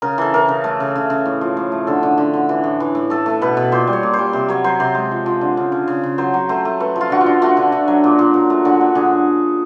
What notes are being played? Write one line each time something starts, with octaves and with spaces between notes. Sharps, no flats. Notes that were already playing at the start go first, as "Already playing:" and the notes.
C#3 A#4
E3 A4
E3 A#4
C#3
A3 A4
C#3
C#3
C#3
A2
F3
A2
A3
D3 A4
D3
D3
D3
E3
A2
E3
A2
A3 A4
A3
B2 B4
B2
A#2 C5
G3
C#5
A#2
C5
G3
C3 C5
F#3 C#5
F#3 C5
C3 C5
G#3
F3
F3
D3
C#3
C#3
C#3
C#3
F#3 C5
F#3
A3 C5
A3
A3 B4
F3
F4
D3 F#4
F4
D3
A3 F#4
D3
D3
F#3
A#2
A#2
A#2
A3
D3 F#4
D3
D3 G#4